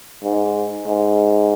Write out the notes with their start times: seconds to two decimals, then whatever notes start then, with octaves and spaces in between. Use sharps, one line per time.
0.23 G#2
0.87 G#2